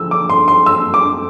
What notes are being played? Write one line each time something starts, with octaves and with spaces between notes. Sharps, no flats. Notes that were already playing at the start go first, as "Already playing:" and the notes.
Already playing: D3 F3 E6
D6
C6
C6
E6
D6